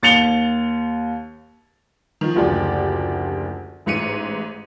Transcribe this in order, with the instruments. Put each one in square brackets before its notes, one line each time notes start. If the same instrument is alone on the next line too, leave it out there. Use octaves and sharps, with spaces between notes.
[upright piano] D#2 A6 C#7 F7 G7
[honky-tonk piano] D#3 F3
F#1 D2 F3 G4 D5
A1 G#2 C#7 D#7